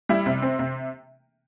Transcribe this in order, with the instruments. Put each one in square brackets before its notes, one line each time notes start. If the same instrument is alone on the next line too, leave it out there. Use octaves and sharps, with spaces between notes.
[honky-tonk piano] G3 E4
C3
C4
C3